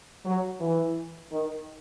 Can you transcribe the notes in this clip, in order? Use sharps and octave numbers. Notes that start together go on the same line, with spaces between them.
F#3
E3
D#3